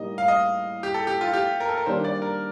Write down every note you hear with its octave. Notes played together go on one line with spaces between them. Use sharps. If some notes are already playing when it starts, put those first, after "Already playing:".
Already playing: A2 G3 A#3 D#4 D#5
F5
D#5
G4
A4
G4
F4
G4
A#4
A4
A#4
D#3 G3 A#3 D4 C5
D5
A#4